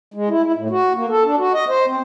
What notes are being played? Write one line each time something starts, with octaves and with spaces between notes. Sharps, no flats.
G#3
E4
E4
A2
F#4
A#3
A4
D4
F#4
D#5
C5
C4